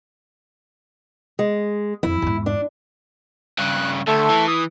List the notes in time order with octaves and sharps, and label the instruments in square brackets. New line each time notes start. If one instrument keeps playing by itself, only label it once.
[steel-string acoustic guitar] G#3
[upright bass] F2 [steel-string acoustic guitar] E4
[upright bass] E2 G#2
[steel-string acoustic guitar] D4
[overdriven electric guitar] G2 C#3 [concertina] F#6
[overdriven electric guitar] D2 [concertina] A3 A4
[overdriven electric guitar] E3
[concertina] D#6